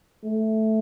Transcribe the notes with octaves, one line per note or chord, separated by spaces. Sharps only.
A3